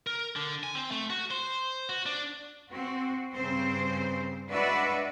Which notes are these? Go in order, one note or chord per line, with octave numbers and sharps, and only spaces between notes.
A#4
D3
G#5
C4
A3
F#4
C5
F#4
D4
C4 F#4
G2 C#3 C4 C5
G#3 D4 F#4 B4 D5 E5